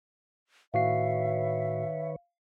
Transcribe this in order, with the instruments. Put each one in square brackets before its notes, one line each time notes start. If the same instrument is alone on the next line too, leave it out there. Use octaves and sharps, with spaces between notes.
[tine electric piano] A2 F#4 C7 [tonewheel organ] D#3 B4 C#5 [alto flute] E5 [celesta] F5